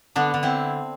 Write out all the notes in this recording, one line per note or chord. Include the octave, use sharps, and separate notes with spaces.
D3 B3 D4
D3
C4 E4